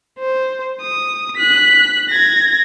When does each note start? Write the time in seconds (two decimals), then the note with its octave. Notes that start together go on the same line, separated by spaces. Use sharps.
0.19 C5
0.82 D#6
1.37 F#6 B6
2.09 G#6 A#6